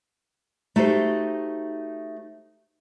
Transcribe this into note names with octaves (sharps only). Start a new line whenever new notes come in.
A3 D#4 F#4 G4 C5